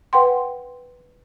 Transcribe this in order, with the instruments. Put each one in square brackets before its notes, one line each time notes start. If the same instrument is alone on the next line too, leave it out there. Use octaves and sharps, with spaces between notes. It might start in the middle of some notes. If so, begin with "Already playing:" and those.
[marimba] B4 F#5 G5 C6